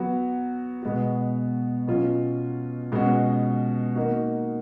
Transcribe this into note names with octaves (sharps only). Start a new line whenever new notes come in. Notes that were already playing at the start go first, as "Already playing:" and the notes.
Already playing: F#3 B3 F#4
B2 G#3 B3 F#4
B2 F#3 C#4 F4
B2 G#3 C#4 F#4
D#3 A#3 D#4 F#4